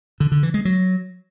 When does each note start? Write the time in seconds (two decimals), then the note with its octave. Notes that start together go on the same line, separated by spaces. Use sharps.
0.20 D3
0.32 D3
0.43 E3
0.54 G#3
0.65 F#3